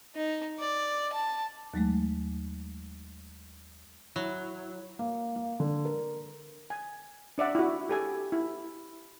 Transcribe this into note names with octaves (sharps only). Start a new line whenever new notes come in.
D#4
D5
A5
D#2 F#3 G#3 A3
F#3 E4
A#3
A#3
D3
A#4
G#5
D4 D5 E5 F#5
E4 F#4
G4 A4 G#5
E4